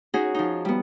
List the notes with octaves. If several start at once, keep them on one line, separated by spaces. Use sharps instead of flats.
C#4 D#4 F#4 G#4
F3 D#4
G3 B3